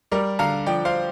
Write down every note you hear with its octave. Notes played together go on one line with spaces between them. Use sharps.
G3 A#4 D5
D3 F5 A#5
F3 D5 G5
C5 F5